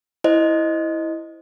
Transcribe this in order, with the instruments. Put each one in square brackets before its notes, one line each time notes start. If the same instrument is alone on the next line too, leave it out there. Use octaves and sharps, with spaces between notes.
[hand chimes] E4 C5 D#5